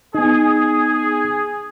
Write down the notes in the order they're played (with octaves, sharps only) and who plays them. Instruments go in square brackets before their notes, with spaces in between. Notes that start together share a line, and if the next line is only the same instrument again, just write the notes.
[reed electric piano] B3 D#4 [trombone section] G#4